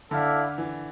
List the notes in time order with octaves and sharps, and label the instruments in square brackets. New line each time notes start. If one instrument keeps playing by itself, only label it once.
[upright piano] D3 [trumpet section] E4 A4 D5 F5
[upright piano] E3